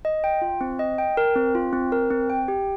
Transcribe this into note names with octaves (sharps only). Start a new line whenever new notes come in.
D#5
G5
F4
C4
D#5
G5
A#4
C4
F4
C4
A#4
C4
G5
G4